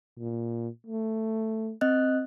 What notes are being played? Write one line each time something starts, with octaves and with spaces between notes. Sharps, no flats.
A#2
A3
C4 D#5 F#6